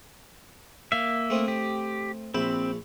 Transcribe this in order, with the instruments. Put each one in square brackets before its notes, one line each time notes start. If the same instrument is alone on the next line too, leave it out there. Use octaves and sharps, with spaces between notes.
[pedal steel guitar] A#3 E5 [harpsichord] F5
[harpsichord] A3 C4 D#5
[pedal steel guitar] G4
[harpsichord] A#1 E5 B5 [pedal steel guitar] C4